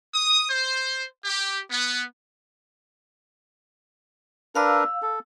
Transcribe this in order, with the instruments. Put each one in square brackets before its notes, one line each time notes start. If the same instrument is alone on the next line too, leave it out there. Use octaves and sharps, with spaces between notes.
[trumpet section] D#6
C5
G4
B3
[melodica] D4 A#4 B4 [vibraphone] F5 E6
[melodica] A4